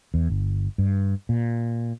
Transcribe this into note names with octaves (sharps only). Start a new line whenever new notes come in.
E2
G1
G2
A#2